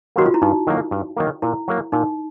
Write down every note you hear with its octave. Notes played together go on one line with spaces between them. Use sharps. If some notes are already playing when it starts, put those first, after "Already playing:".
D#3 F#3 A#3 F#4
F4
E4
G2 D#4
D#3 F#3 A#3
G2
D#3 F#3 A#3
A#2 E4
F#3 A#3
A#2 D#4